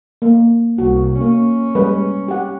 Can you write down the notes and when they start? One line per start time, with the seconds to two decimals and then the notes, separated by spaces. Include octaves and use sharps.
0.22 A#3
0.78 C2 F#4
1.21 A#3 C#4
1.75 G3 G#3 B4
2.28 G4 F#5